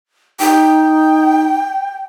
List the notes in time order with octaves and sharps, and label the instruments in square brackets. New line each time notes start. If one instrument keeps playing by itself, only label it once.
[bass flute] D#4 [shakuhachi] G5